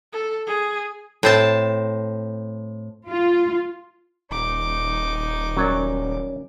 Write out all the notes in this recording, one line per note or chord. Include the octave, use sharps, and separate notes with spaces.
A4
G#4
A2 C4 A5
F4
D#1 D#4 D6
F#3 C#4 A#4 C#5 D5